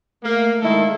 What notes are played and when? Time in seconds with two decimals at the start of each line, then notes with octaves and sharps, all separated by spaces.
0.23 A3 A#3
0.61 D#3 G#3 E4 A4